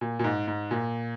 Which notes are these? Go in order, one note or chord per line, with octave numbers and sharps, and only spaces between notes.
A#2
A#2
G#2
G#2
A#2